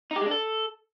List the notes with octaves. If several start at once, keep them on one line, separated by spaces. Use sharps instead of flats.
D#4
G4
G#3
D4
A4